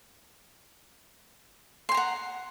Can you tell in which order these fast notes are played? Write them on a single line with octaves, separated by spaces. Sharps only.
C6 G5 A#5 F#5